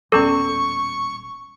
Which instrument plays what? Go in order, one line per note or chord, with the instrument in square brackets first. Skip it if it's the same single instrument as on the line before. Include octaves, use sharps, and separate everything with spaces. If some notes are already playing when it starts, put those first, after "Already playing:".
[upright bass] D#1 A1 [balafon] G3 B3 C#4 [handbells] A4 [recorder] C#6